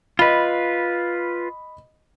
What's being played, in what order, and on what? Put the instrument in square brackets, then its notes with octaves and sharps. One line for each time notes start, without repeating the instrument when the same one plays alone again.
[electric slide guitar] F4 B4 [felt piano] D#5 B5